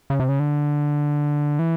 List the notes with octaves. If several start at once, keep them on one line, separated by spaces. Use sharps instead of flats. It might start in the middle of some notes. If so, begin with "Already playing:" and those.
C#3
C3
C#3
D3
E3